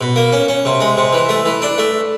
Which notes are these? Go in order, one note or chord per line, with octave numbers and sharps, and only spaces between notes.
B2
A#3
C#4
C#4
C3
G#3
C3
E3
A3
E3
D4
A3